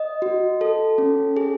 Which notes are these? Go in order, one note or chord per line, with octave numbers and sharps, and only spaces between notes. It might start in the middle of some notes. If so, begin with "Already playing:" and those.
Already playing: D#5
F#4
A4
C#4
G#4